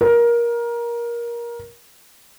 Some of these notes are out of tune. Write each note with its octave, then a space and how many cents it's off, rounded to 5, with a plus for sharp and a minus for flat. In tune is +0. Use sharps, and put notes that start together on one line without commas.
A#4 +20